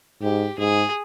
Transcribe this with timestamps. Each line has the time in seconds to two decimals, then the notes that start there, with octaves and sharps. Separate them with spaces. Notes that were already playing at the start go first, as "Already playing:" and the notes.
0.22 G#2 G4
0.58 G#2 G#4